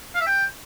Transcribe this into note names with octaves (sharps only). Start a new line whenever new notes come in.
F5
E5
G5